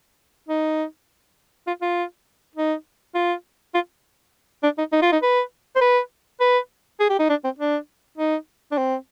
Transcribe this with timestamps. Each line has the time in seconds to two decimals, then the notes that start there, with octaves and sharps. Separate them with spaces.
0.48 D#4
1.67 F4
1.82 F4
2.55 D#4
3.15 F4
3.74 F4
4.63 D4
4.78 D#4
4.92 D#4
5.02 F4
5.12 D#4
5.22 B4
5.76 C5
5.81 B4
6.40 B4
7.00 G#4
7.10 G4
7.19 D#4
7.29 D4
7.44 C4
7.59 D4
8.18 D#4
8.72 D4
8.77 C4